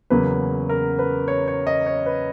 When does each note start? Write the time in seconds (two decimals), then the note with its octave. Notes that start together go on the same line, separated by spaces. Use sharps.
0.10 E2 C#3 F#3 A#3 B4
0.69 A#4
0.99 B4
1.28 C#5
1.48 C#5
1.67 D#5
1.86 C#5
2.06 B4